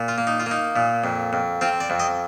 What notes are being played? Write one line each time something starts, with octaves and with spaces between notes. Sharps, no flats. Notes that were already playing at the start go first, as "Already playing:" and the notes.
Already playing: A#2
F4
A#3
D#4
F4
A#3
D#4
A#2
F2
F2
C4 F4
D5
F2
D#5